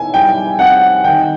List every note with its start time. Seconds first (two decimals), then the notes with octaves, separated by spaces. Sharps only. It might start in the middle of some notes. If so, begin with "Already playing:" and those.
Already playing: D#3 E4 G#5
0.14 G3 G5
0.59 C4 F#5
1.04 D#3 G5